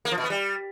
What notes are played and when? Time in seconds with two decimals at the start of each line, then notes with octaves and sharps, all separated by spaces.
0.05 A#3
0.11 F3
0.18 B2
0.24 B3
0.30 G3